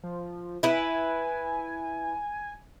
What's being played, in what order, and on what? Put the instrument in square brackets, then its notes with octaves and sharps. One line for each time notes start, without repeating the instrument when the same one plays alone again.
[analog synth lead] F3
[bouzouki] E4 B4 [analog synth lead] G#5